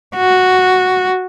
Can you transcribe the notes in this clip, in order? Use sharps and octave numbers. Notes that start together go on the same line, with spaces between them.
F#4